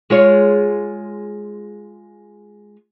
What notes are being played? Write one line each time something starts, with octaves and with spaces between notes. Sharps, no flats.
G#3 F4 C#5